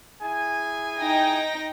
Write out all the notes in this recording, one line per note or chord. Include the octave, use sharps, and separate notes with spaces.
E4 G#4 G#5
D#4 G5 A#6